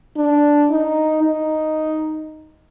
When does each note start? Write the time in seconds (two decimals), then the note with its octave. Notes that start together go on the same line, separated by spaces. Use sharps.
0.16 D4
0.70 D#4
1.23 D#4